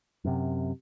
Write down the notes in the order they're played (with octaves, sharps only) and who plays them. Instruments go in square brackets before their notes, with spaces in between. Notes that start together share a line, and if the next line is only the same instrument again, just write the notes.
[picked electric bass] F#2 C3